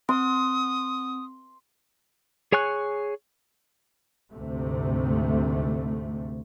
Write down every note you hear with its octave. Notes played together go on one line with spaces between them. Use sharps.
C4 C6 D#6
G#4 C#5 G#5 C#6 F#6
D2 G#2 C3 A3